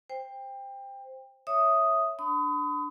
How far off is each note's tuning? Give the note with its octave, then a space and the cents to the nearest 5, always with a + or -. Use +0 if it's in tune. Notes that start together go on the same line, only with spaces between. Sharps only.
C5 +0 G5 +20
C#5 +0 E5 +0 D#6 +0
D4 +0 B5 +40 D#6 +15